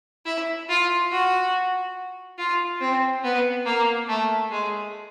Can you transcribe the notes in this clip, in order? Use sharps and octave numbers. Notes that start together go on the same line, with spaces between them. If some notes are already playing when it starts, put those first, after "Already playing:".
E4
F4
F#4
F4
C4
B3
A#3
A3
G#3